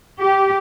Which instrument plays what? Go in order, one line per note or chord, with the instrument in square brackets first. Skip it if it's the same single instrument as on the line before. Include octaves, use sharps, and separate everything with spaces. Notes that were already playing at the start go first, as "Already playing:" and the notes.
[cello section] G4